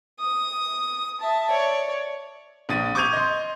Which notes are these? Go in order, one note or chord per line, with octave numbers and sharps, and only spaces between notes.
D#6
E5 A5
C#5 D5
A#1 D#6 A6 D#7
C#6 D6 G6 G#6 D#7 F7
D#5 C6